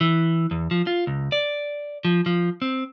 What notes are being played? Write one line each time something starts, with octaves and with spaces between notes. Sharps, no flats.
E3
E2
F3
F4
C#2
D5
F3
F3
C4